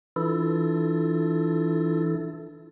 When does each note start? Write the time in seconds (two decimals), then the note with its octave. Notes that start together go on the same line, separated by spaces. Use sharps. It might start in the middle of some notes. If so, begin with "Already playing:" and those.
0.16 E3 D4 E4 F4 A4